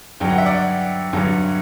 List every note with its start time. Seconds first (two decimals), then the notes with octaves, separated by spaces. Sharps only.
0.20 G2 D3 F#3 G5
0.29 F#5
0.38 E5
0.46 D5 F#5
1.13 G2 D3 F#3